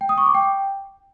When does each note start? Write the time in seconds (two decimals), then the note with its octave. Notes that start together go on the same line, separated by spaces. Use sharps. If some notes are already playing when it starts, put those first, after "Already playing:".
0.01 G5
0.09 D#6
0.18 C#6
0.26 D6
0.34 G5